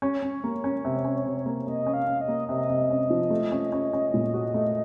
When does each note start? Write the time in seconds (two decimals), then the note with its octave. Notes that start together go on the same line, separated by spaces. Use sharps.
0.02 C#4 C#5
0.22 C#4
0.44 A#3
0.64 C#4
0.85 C3
1.04 C#4
1.26 C3
1.46 A#3
1.67 A#3 D#5
1.86 C#4
1.94 F5
2.07 C#4
2.21 D#5
2.28 A#3
2.48 C3 D#5
2.70 C3
2.90 C#4
3.10 F3
3.30 A3
3.52 C#4
3.72 C#4
3.93 C#4
4.14 A#2
4.34 F#4
4.54 A3